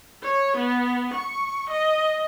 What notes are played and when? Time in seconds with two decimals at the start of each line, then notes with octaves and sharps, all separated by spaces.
0.23 C#5
0.57 B3
1.14 C#6
1.70 D#5